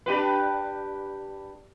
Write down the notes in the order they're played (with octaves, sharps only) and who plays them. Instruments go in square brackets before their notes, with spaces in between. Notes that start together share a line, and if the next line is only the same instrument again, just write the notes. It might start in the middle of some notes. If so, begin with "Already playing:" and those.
[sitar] D4 G4 B4